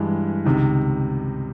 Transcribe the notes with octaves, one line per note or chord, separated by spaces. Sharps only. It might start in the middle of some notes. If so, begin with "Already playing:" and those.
Already playing: G2 E3 G#3
C#2 C3 D#3